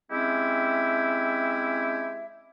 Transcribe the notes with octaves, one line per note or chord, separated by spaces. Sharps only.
G#3 C4 C#4 E4 G4 E5